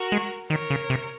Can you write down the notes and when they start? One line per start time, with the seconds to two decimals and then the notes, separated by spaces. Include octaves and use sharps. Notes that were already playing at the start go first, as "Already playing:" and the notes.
Already playing: F#4 A#4
0.12 G#3
0.50 D#3 A#4 C#5
0.70 C#3
0.90 C3